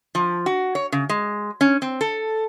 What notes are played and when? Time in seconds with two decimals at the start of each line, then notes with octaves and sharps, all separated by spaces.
0.15 F3
0.46 F#4
0.75 C#5
0.92 C#3
1.09 G#3
1.61 C#4
1.82 C4
2.01 A4